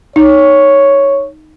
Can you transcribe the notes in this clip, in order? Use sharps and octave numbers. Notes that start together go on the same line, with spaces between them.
D#4 C#5